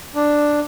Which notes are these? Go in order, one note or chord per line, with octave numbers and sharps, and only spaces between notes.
D4